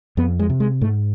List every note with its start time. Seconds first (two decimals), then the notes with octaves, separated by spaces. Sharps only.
0.17 F2 B3
0.39 G#3
0.50 C3
0.60 G#3
0.81 G#2 A3